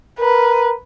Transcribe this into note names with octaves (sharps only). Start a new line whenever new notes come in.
A#4 B4